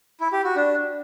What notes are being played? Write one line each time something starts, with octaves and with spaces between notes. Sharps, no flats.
E4
G4
F#4
D4